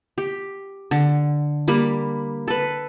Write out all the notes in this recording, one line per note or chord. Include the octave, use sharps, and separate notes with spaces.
G4
D3
G3 A#3 B5
A4 B4